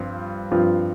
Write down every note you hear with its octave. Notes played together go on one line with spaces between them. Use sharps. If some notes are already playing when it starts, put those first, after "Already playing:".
Already playing: G2 F3 C4 F4
G2 F3 C4 F4